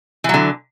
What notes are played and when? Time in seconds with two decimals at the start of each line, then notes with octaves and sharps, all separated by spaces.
0.24 E3
0.29 F#3
0.34 D3